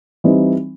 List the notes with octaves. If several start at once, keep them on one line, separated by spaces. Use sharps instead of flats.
E3 G3 C4 D#4